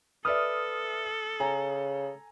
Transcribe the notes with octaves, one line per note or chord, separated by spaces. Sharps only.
A4 B4 D5 E5 D#6 F6
C#3 G#5 A#5